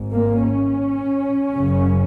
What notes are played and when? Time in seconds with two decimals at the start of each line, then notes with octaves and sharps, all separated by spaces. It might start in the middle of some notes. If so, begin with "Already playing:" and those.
Already playing: G#1 G#2
0.13 A#3
0.41 C#4
1.53 F#1 F#2 C#3